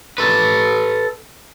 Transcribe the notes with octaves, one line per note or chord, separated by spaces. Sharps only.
A4 B4